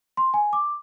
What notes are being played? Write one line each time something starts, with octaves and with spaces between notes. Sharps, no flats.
C6
G#5
D6